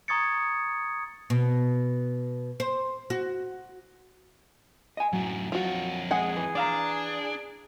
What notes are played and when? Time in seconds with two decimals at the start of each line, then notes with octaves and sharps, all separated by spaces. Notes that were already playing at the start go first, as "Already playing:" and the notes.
0.08 A#5 C#6 D#6 G#6 A6 C#7
1.30 B2
2.60 C5
3.10 F#4
4.97 D#5 G#5
5.13 F#2 A2 F#3
5.52 F2 F4 F#4 C#5
6.11 G#3 G#4 F#5 G#5
6.37 E3
6.55 D4 D5 F5 A#5